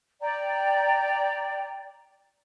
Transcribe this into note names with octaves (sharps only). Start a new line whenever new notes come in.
D5 G5 A#5